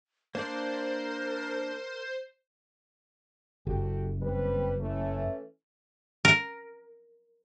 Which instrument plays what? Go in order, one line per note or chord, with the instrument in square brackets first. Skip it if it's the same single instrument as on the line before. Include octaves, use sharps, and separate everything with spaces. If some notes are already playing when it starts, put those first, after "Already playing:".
[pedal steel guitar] A#3 D4 D5 [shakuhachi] A#4 [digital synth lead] C5
[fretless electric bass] F#1 [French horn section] F#4 G4 A4
[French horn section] G3 C4 B4
E3 A3 C#4
[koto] A#4